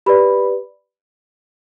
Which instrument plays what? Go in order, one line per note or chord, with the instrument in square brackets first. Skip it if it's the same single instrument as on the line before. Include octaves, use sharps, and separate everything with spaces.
[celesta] G4 B4 D5 B5